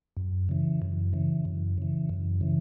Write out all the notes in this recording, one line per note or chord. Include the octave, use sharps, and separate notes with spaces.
F#2
C#3 E3
F#2
C#3 E3
F#2
C#3 E3
F#2
C#3 E3